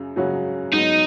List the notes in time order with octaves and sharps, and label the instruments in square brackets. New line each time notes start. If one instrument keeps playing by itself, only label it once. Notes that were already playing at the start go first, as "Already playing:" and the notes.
Already playing: [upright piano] F#2 C#3 F#3
F#2 C#3 F#3 C#4 F#4
[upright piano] G#2 F#3 B3 [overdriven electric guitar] D#4